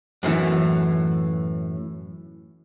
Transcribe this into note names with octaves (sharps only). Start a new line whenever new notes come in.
F#2 A2 D3 E3